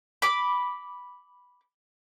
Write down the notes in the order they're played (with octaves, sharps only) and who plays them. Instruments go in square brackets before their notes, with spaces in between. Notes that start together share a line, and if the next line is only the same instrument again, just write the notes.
[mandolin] B5 D6